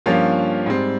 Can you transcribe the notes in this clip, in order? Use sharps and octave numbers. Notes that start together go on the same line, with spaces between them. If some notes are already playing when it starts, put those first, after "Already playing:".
G2 F3 A#3 C#4 F4
G#2 G3 C4